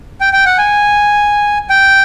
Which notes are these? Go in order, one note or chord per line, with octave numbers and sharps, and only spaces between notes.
G5
G5
F#5
G#5
G5